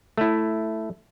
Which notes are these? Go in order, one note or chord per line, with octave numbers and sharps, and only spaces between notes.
A3 E4